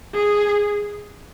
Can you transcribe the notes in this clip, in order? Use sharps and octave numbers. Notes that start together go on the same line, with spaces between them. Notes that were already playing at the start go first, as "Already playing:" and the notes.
G#4